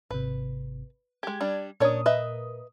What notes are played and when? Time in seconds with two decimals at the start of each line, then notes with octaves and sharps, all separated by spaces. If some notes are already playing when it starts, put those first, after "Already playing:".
0.11 G#1 C3 B4
1.23 G#3 G4 G#6
1.41 G3 D4
1.80 A#2 C#4 D4 A#4 C#5 D#6
2.06 B4 D#5 E5